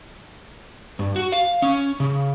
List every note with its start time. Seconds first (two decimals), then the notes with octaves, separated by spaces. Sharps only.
0.99 G2
1.16 F#4
1.32 F5
1.62 C#4
2.00 C#3